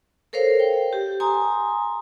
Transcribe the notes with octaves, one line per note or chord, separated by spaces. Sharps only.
A4 A#4 C5 C#5 F5
G5
G4
G#5 A#5 C6 D#6